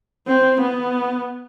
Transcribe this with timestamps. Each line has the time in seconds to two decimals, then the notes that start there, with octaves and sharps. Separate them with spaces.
0.27 C4
0.61 B3